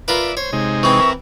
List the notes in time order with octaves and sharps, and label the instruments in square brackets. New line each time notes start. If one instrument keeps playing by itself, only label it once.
[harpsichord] F4 A#4 B4 [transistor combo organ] D5 E5
[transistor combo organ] C5 [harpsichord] C#5
[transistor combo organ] C3 G#3 D#4
[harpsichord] E3 C4 [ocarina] C#6
[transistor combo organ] A#4 E5